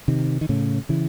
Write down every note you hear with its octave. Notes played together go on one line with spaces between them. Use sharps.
C3 D#3
D#3
A2 C#3
C#3 E3